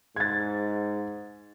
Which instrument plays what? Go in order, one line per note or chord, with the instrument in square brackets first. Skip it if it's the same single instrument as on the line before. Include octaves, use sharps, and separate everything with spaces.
[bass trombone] G#2 [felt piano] G#6 A6